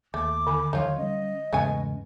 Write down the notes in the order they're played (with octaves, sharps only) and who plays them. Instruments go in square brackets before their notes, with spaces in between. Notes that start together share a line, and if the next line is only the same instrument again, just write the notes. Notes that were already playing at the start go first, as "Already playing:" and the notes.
[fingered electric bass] D#2 [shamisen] A3 [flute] D6
[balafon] D3 G#5 B5
[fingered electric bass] E2 D#3 F#3 [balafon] D3 [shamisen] D#4 F4 [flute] C#5
[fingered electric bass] G3 C#4 [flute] D#5
[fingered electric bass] E2 G#2 C#3 [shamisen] A3 B3 G#5